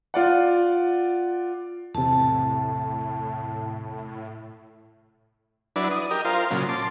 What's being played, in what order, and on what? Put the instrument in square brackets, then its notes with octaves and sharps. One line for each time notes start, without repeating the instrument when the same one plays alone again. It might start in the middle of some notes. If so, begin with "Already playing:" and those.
[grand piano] F4 D5 F#5
[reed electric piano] E2 C3 [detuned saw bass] A2 [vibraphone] A5
[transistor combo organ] F#3 D4 E4 B4 D5
D#6
G4 A#4 D#5
F4 A#4 C5 F5
A#2 C#3 F#3
A5 C6 D6